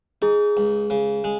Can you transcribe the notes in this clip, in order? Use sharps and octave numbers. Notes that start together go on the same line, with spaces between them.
D#4 G#4
C#2
C#3
G#3